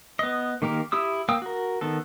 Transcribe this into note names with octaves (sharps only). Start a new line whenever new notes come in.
B3 D#5
D#3 A#3 G4 A#4
E4 G4 D#6 E6
A#3 F5 G5 D#6 E6
F#4 A#4
D#3 B3 A4